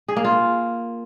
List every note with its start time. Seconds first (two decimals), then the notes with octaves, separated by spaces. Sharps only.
0.08 G#4
0.16 A#3
0.24 F4